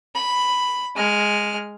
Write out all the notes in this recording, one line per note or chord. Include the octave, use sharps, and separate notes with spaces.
B5
G#3 F6